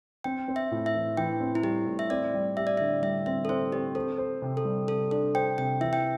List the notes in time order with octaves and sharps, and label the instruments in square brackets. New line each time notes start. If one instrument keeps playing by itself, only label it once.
[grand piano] C4 [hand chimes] G5
[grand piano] C4
[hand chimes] E5
[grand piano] A2
[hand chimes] E5
[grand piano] E3
[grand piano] E3 [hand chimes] G5
[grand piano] C4
[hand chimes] E4
[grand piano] G3 [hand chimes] G4
[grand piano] A2
[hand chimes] E5
[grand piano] C4 [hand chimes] D5
[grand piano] G3
[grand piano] G4 [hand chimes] E5
[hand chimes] D5
E5
[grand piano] D3
[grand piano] G3 [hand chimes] E5
[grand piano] C4 [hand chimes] E5
[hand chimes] A4
[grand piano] C4 [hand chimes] C5
[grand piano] C4 [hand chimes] G4
[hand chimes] A4 [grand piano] C5
[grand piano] C5
C3
[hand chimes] A4
[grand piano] G3
[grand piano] C3 [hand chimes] A4
[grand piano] D4 [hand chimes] A4
[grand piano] C5 [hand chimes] G5
[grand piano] C3 [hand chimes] G5
[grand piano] E3 [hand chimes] E5
[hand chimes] G5